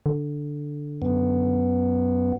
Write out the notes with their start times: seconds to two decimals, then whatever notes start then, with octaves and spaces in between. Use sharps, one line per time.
0.06 D3
1.02 F#2 B3